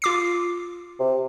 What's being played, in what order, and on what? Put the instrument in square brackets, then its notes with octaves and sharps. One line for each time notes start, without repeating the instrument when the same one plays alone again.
[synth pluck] F4 D6 C7
[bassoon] C3